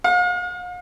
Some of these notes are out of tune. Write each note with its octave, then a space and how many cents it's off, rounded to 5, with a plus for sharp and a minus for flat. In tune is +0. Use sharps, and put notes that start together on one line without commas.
F5 +45